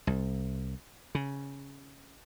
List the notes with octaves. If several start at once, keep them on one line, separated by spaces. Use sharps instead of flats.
C2
C#3